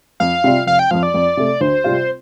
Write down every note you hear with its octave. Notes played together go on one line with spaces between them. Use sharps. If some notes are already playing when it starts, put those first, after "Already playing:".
F2 F5
C3 G3 F4
F1 F5
G5
F2 F3 F5
D5
F2
C3 A3
D2 C5
C3 G3 C4 F4